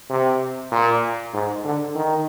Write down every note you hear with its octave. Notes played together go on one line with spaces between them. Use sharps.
C3
A#2
G#2
D3
D#3